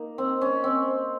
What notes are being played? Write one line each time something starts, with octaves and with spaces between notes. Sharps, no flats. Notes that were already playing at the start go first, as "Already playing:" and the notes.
Already playing: A#3 D#4
C4
C#4
C4